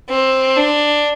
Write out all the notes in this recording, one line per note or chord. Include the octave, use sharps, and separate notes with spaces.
C4
D4